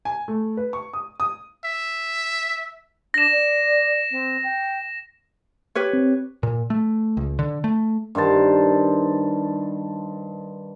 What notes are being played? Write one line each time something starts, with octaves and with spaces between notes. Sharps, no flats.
G#5
A3
B4
C#6
D#6
D#6
E5
D4 A#6 E7
D5
C4
G5
G4 B4 C#5
C4
A#2
A3
C#2
D3
A3
G2 D#3 C5 A5